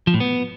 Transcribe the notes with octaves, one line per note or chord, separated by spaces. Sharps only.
F3
A2
B3